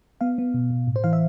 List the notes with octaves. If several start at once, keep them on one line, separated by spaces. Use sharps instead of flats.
B3 F5
B3
B2
B2
A2
C5
E3 F5
E5